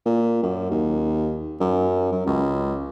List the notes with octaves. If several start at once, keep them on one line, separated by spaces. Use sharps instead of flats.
A#2
F#2
D#2
F#2
F#2
C#2